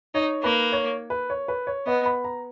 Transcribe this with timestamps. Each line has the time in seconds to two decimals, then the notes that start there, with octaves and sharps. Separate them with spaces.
0.14 D#4 C#5
0.43 A#3 B4
0.72 C#5
1.10 B4
1.30 C#5
1.48 B4
1.67 C#5
1.86 B3 D#5
2.06 B5
2.24 A#5